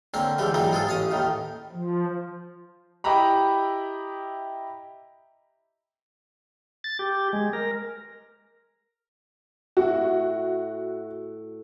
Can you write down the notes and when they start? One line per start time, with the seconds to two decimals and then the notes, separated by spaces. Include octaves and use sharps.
0.14 D3 A#3 C4 C#4
0.38 C#2 D3 E3 G3 G4
0.54 G#2 E3 F#3 G3 A#3
0.71 G#3 F4 G#4 A4
0.87 A1 C#4 F5 D#6
1.11 D#2 A2 D#3
1.72 F3
3.04 E4 G4 D#5 E5 A#5 B5
6.84 A6
6.99 G4
7.33 G#3
7.53 A#4
9.77 A2 F#4